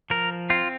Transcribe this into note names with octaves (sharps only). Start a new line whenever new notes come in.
F3 A#4
C4 F4